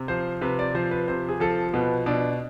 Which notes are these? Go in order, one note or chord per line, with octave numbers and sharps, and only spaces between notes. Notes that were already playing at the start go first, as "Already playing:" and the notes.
Already playing: C3
F3 C5
C3 B4
D5
F3 C5
B4
C3 C5
G#4
F3 A4
B2 B3
B2 D4